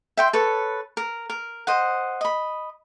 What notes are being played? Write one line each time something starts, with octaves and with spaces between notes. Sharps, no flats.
E5 G5 C6
A4 B4 C#5
A#4
A#4
C5 D#5 F#5
D#5 B5